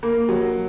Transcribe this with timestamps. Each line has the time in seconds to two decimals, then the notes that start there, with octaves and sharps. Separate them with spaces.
0.03 A#3
0.29 F#3